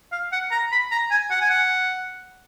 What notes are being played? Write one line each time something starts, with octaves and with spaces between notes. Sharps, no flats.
F5
F#5
A#5
B5
A#5
G#5
F#5
G#5
F#5